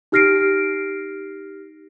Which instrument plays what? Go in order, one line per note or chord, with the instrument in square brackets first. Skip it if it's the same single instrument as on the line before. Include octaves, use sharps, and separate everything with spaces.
[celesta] D#4 G4 F6 A#6 C7 D7